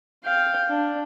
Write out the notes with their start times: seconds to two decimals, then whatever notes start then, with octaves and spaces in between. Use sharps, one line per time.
0.24 F5 G5
0.69 D4